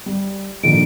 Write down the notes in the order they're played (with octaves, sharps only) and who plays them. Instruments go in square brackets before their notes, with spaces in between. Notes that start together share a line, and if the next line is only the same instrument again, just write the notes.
[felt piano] G3
[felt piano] A#1 D3 D#3 [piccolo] D7